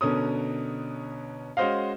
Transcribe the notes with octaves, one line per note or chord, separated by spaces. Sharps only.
B2 D3 C#4 A#4 D#6
G#3 C#4 F#4 C5 D#5 F5